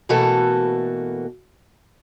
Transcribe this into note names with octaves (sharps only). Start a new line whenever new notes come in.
B2 E3 A3 A#3 F#4 A4